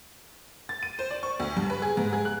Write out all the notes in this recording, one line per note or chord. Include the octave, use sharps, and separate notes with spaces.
A6
D#7
C5
D5
C#6
D2
G2
B4
G#4
G#2
G#4
F#6